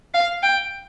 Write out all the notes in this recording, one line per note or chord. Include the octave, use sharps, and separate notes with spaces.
F5
G5